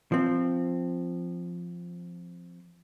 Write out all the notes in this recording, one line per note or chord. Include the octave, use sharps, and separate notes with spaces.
F3 C4